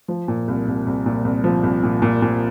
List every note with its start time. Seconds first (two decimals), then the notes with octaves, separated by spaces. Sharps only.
0.08 F3
0.28 A#2
0.48 C2
0.68 C2
0.86 C2
1.06 A#2
1.24 C2
1.44 F3
1.63 C2
1.83 A#2
2.02 A#2
2.22 A#2